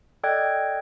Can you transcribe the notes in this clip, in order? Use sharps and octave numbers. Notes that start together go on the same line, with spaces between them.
A4 D5 D#5 G5 F#6 G#6